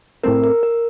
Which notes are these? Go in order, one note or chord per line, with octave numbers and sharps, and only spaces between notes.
A2 A3 C4 A#4
A#4
A#4